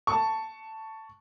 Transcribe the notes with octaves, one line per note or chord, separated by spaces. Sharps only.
A5 C#6